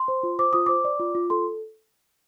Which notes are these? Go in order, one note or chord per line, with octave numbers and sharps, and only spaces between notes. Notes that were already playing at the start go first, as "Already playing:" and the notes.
Already playing: C6
C5
F4
C5 D6
F4 D#6
C5 D6
D5
F4
F4
A4 C6